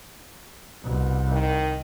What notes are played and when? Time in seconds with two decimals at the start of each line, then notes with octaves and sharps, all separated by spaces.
0.83 C2 B2
1.32 D#3